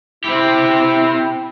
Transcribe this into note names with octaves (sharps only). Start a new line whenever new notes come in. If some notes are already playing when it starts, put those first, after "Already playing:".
C4 E4 G4